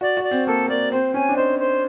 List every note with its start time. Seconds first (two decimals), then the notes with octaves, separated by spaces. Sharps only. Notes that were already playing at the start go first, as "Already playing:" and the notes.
0.01 F#4 D5
0.17 F#4
0.24 D5
0.31 C4
0.47 A#3 A4
0.69 A#3 D5
0.92 C4 C5
1.14 C#4 G#5
1.29 D4
1.37 D#4 C5
1.59 C5